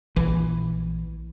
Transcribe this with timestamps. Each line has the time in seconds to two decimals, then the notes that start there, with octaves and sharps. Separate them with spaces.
0.16 A#1 E3